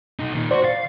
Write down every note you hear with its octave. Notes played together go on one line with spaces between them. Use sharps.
B1 D#4
A#2 D#3
F#4 C5 D5
F5 A6